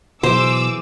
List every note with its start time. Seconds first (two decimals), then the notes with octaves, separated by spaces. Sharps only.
0.23 B2 E3 F#3 G#4 C5 D6 E6